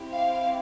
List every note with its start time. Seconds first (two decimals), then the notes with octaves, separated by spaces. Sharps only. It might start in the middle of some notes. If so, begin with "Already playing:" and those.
Already playing: C4 E4 G4
0.11 F5